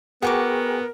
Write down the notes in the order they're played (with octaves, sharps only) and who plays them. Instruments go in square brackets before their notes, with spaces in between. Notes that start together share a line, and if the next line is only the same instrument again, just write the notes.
[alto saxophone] B3 [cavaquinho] F#4 C#6 D6 [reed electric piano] G#4 G5 G#5 [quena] A#4